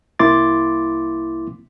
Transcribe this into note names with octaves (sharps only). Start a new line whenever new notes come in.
C2 A#3 E4 C6 D6 A6